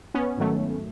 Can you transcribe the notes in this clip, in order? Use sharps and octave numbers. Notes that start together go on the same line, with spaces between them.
B3 C#4
G#2 D#3 F#3 A3